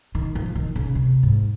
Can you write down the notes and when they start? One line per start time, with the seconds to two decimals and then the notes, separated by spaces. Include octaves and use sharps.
0.15 D#3
0.35 F3
0.55 D#3
0.76 C#3
0.95 C3
1.23 G#2